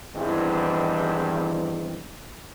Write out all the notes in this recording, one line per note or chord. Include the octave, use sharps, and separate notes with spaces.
E2 G2 D#3 E3 G#3 C4